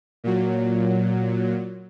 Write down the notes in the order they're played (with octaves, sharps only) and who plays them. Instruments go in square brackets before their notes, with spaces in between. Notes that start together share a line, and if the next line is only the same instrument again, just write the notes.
[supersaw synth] A#2 F#3